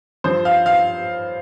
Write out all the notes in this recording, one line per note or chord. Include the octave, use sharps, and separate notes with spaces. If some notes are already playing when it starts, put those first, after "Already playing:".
G2 F3 C5
F5
F5